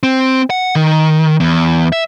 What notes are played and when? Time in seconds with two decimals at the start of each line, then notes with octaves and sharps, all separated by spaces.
0.03 C4
0.50 F#5
0.75 D#3
1.40 E2
1.92 E5